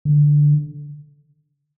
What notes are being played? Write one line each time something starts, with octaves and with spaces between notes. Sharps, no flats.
D3